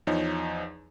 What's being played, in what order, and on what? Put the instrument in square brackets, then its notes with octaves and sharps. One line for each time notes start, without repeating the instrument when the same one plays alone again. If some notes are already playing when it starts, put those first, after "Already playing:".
[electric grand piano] E2 F3 D#4 C#5